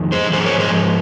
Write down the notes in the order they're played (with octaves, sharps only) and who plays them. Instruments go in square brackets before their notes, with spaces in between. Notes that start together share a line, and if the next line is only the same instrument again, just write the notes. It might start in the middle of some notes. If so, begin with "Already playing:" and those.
Already playing: [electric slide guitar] F2 D#3
G#4 C5
G#2 F3 G#4 C5
A#4 C#5
G#4 C5